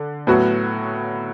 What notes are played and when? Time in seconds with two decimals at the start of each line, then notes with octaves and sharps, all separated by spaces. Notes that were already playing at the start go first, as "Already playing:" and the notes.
Already playing: D3
0.27 A2 F#3 B3 F#4